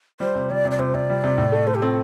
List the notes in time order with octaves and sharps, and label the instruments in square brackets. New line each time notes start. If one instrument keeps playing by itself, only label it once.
[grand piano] G3 [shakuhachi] C5
[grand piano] C3
[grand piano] G3 [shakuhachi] D5
[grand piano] C3
[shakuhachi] D5
[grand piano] C3 [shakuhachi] C5
[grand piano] C3 [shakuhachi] D5
[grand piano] G3
C3
A2
A3
[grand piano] A3 [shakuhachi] C5
[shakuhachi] G4
[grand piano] C4 [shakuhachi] A4